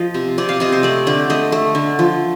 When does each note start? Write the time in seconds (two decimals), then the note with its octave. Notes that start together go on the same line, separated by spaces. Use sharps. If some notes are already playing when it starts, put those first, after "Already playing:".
Already playing: F3 D#5
0.14 C3
0.38 C3 D5
0.49 F5
0.60 C3 D#5
0.72 C5
0.83 A3 D5
1.07 D3 D5
1.30 A3 D#5
1.52 A3
1.75 D3
1.99 F3